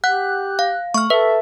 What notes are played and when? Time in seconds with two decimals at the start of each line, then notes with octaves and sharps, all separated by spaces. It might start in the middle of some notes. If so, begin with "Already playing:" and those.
0.04 G4 F#5 F#6
0.59 F5
0.94 A3 C#6 F6
1.10 A4 B4 E5